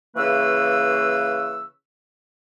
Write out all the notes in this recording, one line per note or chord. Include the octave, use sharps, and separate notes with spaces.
C#3 E3 A#3 B4 C#6 E6